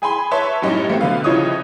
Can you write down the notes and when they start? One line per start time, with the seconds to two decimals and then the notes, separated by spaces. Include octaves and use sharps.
0.02 G#4 G#5 B5 C6
0.31 B4 C#5 E5 A5 C6 C#6
0.62 F#2 A2 G3 C#4 D#4
0.88 E3 A3 B3 C4
1.01 B2 D3 B4 F5
1.24 C2 C#3 F3 D#4 C#5 D#6